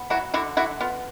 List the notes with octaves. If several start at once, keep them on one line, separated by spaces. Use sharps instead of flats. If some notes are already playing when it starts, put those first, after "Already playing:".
Already playing: B3
F#3 E4 F#4
D3 E4 F#4
D3 E4 F#4
B3 F4